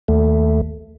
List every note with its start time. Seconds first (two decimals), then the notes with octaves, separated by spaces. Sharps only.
0.08 D#2 A3